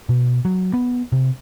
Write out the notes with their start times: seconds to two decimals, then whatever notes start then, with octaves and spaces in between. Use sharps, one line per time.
0.09 B2
0.45 F#3
0.74 B3
1.12 C3